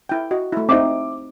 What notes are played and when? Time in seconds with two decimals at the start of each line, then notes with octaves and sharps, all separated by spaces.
0.09 E4 G5
0.31 F#4 D#5
0.53 A3 E4
0.69 C4 D#4 E5 D6